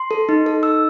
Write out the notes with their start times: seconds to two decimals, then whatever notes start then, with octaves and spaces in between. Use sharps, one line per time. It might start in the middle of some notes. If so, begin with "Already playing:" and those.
Already playing: C6
0.11 A4
0.29 D#4
0.46 A4
0.63 D#4 E6